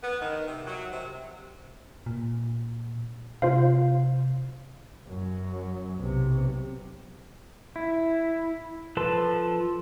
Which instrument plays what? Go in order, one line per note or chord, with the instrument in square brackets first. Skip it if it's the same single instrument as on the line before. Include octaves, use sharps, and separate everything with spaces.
[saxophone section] B3
D#3
C3
F#3
C3
[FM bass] A#2
[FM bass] C3 [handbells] F4 C5 F5
[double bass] F#2
B1 C3
[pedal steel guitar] E4
F3 A4 B4 A5 C6